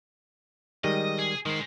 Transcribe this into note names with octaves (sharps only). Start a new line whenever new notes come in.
D#3 G3 G#3 D#5
G#4
D#3 G#3 C5